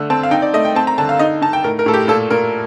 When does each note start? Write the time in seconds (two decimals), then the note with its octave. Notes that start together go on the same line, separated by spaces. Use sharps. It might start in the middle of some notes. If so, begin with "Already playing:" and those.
Already playing: D3 A3
0.10 C4 A5
0.23 F5
0.31 D#4 G5
0.42 D5
0.54 A3 D#5
0.65 G5
0.75 C4 A5
0.87 A#5
0.98 D3 A5
1.09 F5
1.19 D#4 D#5
1.42 D#4 A5
1.53 G5
1.64 A2 A#4
1.79 A#4
1.86 A2 A4
1.93 G4
2.08 A#2 A4
2.31 A#2 A#4